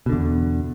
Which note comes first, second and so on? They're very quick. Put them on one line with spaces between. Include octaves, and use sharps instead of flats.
B2 D3 E2